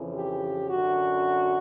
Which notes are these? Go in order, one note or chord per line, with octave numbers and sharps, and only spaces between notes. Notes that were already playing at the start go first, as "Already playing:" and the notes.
Already playing: F2 C#3 E3
G4
F#2 D3 F#4